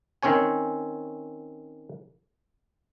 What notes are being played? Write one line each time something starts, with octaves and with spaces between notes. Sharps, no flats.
D#3 C4 C#4 C#5 G#5